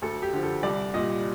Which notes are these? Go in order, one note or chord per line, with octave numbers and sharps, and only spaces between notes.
D2 A4
G4
D3 F3
A4
C2 D5
A#2 G3 D#5